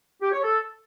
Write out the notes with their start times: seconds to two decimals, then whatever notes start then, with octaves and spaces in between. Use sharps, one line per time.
0.21 G4
0.32 C#5
0.42 A4